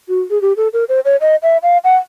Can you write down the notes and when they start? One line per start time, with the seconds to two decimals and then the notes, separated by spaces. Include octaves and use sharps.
0.08 F#4
0.30 G#4
0.41 G4
0.57 A4
0.73 A#4
0.89 C5
1.05 C#5
1.21 D#5
1.43 E5
1.63 F5
1.84 F#5